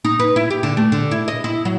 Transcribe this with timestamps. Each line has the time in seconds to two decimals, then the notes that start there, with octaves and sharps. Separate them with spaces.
0.04 D#4
0.19 B4
0.36 E4
0.50 G4
0.63 D3
0.77 A3
0.92 D3
1.11 E4
1.28 D#5
1.44 E4
1.65 F#3